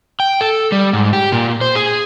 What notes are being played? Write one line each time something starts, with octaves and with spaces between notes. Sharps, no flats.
G5
A4
G3
G#2
G4
A#2
C5
G#4